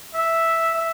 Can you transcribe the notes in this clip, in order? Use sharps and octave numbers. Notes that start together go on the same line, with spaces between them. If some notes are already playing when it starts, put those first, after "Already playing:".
E5
E5